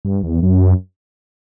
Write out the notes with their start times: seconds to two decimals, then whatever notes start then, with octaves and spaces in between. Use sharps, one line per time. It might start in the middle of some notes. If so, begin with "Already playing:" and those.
0.05 G2
0.23 E2
0.42 F#2